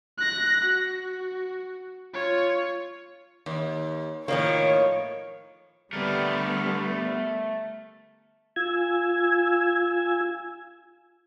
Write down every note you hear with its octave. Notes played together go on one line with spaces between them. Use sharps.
F#6 A#6
F#4
F4 C#5
D#2
A2 D#3 F3 A#3 C#5
D3 G3 A3 B3 A#4
F4 G#5 E6 G#6